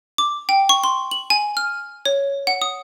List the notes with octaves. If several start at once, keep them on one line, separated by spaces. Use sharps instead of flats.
D6
G5
C#6
C6
F#7
G#5
F6
C#5
F#5
D#6